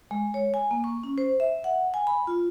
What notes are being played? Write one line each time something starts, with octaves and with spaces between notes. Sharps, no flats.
G#3
C#5
G#5
A#3
C#6
C#4
C5
E5
F#5
G#5
B5
F4